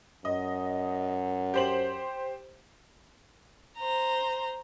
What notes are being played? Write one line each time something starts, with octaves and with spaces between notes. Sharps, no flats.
F#2 D#5
G4 C5 F#7
C5 A#5